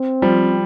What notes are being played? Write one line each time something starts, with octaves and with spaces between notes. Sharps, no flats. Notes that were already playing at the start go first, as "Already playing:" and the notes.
Already playing: C4
F3 G3